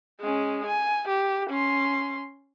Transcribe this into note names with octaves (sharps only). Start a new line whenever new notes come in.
G#3 C#4
G#5
G4
C#4 C6